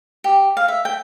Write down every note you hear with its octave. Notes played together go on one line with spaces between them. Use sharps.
G4
F5
E5
G5